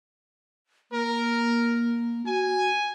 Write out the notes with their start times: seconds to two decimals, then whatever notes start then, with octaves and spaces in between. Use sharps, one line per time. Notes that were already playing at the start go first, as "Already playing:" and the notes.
0.92 A#3 A#4
2.26 F#4 G#5